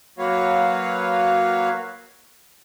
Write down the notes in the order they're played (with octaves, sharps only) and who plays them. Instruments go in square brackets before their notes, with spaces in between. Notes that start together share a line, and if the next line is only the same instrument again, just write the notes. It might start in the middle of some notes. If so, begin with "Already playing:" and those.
[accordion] F#3 A#3 F#4 B4 C#5 F5